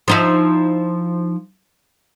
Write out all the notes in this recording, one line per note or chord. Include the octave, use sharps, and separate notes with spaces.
F3 D#4 E4